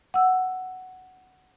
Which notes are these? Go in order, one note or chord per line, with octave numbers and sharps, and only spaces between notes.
F#5 E6